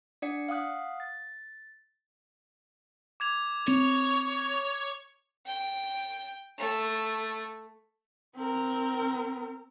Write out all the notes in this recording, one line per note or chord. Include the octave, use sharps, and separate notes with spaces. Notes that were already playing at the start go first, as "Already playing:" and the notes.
D4 D5 F#5 C#7
F5 F#5 D#6 F#6
A6
D6 G#6 F7
C4 C#5 C#6
G5
A3
C4 A#4